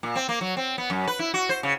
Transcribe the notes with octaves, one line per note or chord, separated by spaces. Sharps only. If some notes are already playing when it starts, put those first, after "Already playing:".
A#2
C4
A#3
F#3
C4
B3
F#2
B4
E4
F#4
C5
C#3